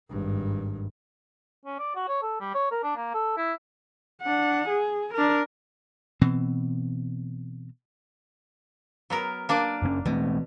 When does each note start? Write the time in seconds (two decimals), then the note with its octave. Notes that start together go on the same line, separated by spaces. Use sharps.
0.10 G#1 G2
1.65 C#4
1.79 D5
1.96 F#4
2.08 C#5
2.22 A4
2.40 G3
2.55 C#5
2.71 A#4
2.83 D4
2.96 A#3
3.14 A4
3.37 E4
4.22 D4 F#5
4.69 G#4
5.14 D4 A#4
6.21 B2 E3 C4
9.10 F#3 B3 A#4
9.49 A#3 D4 D5
9.82 F#1 C#3 C#4
10.06 B2 E3 A3 C4